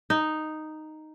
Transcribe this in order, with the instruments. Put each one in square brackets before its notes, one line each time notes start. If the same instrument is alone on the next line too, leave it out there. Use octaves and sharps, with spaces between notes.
[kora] D#4